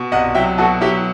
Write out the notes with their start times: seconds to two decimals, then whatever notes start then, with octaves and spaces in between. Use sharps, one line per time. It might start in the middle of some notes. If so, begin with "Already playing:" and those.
Already playing: B2
0.12 C2 D#5 F#5
0.35 F#3 E5 G5
0.58 B2 F#4 A4
0.81 F#3 E4 G4